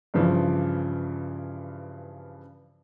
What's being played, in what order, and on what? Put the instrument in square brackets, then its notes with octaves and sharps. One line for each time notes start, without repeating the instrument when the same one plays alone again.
[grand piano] G2 C#3 E3 F3